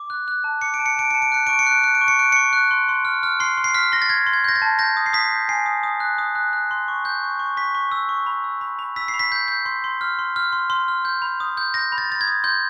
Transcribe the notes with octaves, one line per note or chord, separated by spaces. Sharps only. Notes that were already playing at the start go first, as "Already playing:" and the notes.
Already playing: D6
F#6
F#6
A5
D6 C#7
D7
A5
C#7
A5 D7
A5 C#7
D7
F#6 C#7
C#6 D7
C#7
F#6 D7
F#6 C#7
D7
C#6
C#7
F#6 D7
C#6 C#7
F#6
C6
C6
F6
F6
C6 C7
C6
C7
F6 B6
C6 A#6
A6
C6 G#6
C6
G#6
G6 A#6
A6
A5
G6 A#6
D#6
C7
D#6 B6
G6
G#5 C7
D#6
D#6
F#6
D#6
F#6
F#6
C6
C#6
G6
C#6
C#6
C#6 B6
C#6
E6
C#6
B5
E6
B5
B5
E6 B6
C7
B5
B6
G6
G6
C6
C6
F6
C6
F6
C6
C6
F6
G6
B5
D#6
G6
G6 A#6
B5
A6
B5 A6
G#6
D#6
C6 G6